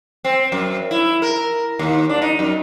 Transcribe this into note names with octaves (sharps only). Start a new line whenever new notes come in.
C4
F#2
E4
A#4
D#2
D4
D#4
F#2